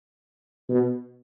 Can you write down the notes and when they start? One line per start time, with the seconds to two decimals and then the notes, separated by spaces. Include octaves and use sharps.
0.70 B2